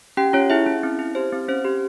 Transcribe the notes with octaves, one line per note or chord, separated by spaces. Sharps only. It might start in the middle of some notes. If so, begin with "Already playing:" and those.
C#4 G4 G5
C#4 F4 C#5
E4 G#4 E5
C#4
C4
E4
G4 C5
C4
C#4 C5
G4